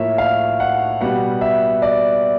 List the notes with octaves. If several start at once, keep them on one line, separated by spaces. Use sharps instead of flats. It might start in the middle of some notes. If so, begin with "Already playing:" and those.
Already playing: A2 F3 A#3 C#5 E5
F5
F#5
B2 G3 B3 F#5
E5
D5